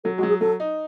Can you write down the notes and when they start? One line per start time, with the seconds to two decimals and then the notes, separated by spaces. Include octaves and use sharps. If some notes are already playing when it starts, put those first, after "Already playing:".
0.04 F#3 A4
0.17 G#3 F#4
0.23 F#3
0.29 G#4
0.41 F#3 A4
0.60 D#4